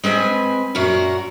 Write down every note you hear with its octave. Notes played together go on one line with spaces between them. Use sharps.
G#3 C4 B4 G#5
F#2 A#2 F#4 A#4